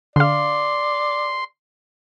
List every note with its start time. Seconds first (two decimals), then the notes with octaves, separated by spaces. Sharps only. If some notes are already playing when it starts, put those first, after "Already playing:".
0.16 D3 D5 F5 C6